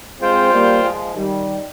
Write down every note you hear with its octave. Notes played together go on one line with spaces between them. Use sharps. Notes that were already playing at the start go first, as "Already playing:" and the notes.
G#3 C4 F4 C5 G5
G3 A#3
F3 G#3
D#3 G3